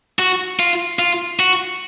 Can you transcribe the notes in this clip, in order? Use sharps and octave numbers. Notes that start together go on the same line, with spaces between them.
F#4
F4
F4
F#4